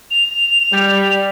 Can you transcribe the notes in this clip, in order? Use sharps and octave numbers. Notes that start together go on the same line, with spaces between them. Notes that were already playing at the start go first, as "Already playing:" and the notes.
F7
G3